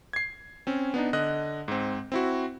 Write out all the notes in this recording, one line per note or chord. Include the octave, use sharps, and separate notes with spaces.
G#6 C7
C4 C#4
B3 D4 D#4
D3 D#5 F#6
G#2 C4
C4 E4 F#4